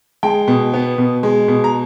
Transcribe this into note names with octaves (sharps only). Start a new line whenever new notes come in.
G#3 G5
B2
B3
B2
G#3
B2
A#5